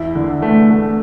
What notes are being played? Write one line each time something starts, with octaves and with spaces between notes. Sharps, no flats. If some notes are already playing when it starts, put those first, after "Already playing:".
Already playing: E2 E4
D3
A3
A3